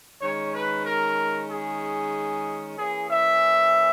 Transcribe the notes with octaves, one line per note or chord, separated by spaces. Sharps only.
D#3 G#3 C#4 C#5
B4
A#4
G#4
E3 A#3 C#4 E4 G#4
E5